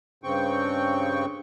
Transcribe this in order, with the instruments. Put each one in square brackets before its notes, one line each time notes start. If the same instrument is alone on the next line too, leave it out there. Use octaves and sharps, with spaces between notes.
[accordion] G2 C#3 C4 G5 C#6